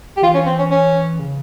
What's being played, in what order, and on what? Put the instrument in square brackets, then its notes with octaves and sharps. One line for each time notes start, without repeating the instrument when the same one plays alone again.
[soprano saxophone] G4
[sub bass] E3 [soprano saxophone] F4
[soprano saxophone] C#4
C4
C#4
C#4
[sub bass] C#3